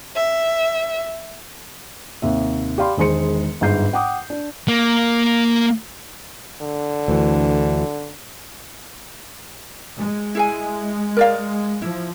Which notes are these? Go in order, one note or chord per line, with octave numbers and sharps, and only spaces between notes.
E5
D#2 C3 E5
G4 D5 F5 B5 C6
E1 D#3 G#3 C5 C6 C#7
G1 G#2 G6 C7
F#5 G5 D6 D#6
D4
A#3
D3
D2 E3
G#3
E4 G#4 G#5
A#4 D5 F5
F3 E4